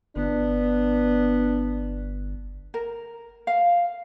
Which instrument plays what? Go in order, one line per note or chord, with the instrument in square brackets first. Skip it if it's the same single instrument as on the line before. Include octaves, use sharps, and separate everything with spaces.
[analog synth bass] G1 [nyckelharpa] B3 [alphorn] D4
[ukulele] A#4
F5